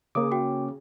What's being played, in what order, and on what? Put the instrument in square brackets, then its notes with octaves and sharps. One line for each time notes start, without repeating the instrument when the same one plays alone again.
[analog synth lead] C#3 [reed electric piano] A#3 D6 [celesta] D#6
[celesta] F#4 G5